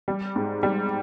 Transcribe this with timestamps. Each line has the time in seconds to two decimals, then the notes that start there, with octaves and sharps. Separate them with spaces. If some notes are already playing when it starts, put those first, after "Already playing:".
0.08 G3
0.36 G#2
0.63 G3